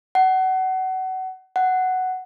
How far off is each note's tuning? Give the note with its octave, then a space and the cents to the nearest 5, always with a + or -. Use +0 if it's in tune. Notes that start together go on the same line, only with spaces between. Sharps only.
F#5 +25
F#5 +5